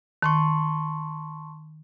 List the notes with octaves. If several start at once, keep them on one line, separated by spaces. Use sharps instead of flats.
D#3 A5 C6 C#6